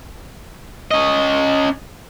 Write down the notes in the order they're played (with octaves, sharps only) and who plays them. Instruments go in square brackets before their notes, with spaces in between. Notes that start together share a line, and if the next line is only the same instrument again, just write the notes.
[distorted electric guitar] C#4 D#5